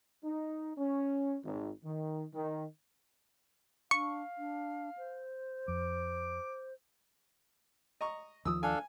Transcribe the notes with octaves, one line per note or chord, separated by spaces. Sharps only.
D#4
C#4
G#1
D#3
D#3
D4 F5 C#6
D4
C5
F2 D6
D#5 A#5 C#6
D#2 F3 D#6 E6
D4 A4 F5 G#5